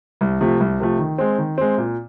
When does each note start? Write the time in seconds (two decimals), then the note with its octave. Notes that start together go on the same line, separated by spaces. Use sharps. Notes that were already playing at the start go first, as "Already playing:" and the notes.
0.21 C2
0.41 C3 F3 A3
0.60 C2
0.80 C3 F3 A3
0.99 D#3
1.18 G#3 C4
1.38 D#3
1.58 G#3 C4
1.78 A#2